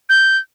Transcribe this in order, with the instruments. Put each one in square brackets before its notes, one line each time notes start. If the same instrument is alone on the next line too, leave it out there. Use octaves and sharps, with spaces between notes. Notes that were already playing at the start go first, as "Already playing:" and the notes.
[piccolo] G6